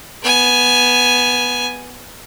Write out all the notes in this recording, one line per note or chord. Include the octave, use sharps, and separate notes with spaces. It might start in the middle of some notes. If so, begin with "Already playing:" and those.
B3 G#5